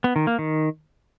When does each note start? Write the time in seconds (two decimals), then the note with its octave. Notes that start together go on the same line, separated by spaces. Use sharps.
0.04 B3
0.16 D#3
0.27 A#3
0.39 D#3